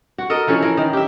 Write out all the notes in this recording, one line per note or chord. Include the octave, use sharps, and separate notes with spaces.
F#4
A4 A#4 D#5
E3 F3 C#4 A4
E3 A#4
D#3
G4 E5